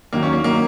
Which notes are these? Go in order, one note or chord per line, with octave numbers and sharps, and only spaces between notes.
D#2 D#3 F#3 A#3
C#4
A#3
D#3 F#3 A#3